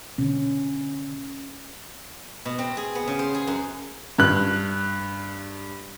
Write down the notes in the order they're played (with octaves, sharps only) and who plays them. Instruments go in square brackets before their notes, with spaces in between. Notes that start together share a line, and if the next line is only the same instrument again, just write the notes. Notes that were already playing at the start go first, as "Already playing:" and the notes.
[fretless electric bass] B2 D3 [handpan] C#4
[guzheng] B2
C4
G#4
B3
C#3
C5
G#4
F#2
[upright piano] G2 F#6